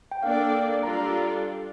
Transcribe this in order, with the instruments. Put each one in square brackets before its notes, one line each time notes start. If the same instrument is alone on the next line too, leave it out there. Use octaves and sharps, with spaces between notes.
[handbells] G5
[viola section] A#3 D4 A4 D5 [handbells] F5
[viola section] G3 D4 F4 A4 D5 [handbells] A#5